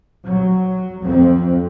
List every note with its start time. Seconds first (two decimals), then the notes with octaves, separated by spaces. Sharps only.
0.24 F#3
1.03 F2 C4